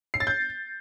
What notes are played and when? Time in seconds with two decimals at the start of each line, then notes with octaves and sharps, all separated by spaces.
0.14 C7
0.20 A6
0.27 G6